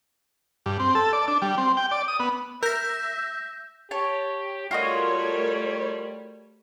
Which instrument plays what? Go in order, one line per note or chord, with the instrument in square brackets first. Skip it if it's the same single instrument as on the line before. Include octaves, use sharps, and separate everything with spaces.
[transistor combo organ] G2
C4
A4
D5
D4
G3
C4
G5
D5
D#6
B3
[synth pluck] A#4 [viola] E5 [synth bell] G6 A#6
[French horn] G4 [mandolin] C#5 A5
[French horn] G3 [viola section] A3 A#4 C#5 [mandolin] F4 F#4 D#5